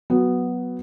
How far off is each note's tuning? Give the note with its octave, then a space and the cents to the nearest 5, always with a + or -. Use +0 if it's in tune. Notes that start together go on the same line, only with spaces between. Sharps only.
F#3 +0 B3 +0